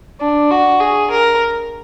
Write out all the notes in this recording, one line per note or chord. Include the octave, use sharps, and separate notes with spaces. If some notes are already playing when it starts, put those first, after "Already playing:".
D4
F#4
G#4
A#4